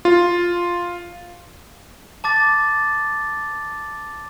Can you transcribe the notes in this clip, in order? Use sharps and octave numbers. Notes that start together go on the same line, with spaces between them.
F4
A5 D6 A6